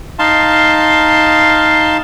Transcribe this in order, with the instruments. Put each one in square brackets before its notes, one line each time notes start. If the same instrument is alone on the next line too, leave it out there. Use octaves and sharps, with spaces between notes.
[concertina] D#4 F5 A5 C6